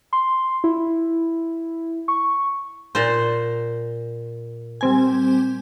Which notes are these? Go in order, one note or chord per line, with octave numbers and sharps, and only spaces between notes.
C6
E4
C#6
A#2 C5
G3 C4 G#5